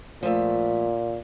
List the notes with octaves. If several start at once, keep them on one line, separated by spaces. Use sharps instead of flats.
A#2 F3 A3 E5